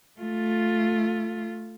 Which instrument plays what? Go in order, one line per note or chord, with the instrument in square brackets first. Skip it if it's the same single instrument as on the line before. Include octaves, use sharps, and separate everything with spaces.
[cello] A3 F4